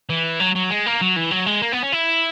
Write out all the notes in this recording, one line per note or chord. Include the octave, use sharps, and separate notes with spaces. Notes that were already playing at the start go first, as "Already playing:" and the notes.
E3
F#3
F#3
G#3
A#3
F#3
E3
F#3
G#3
A#3
B3
C#4
E4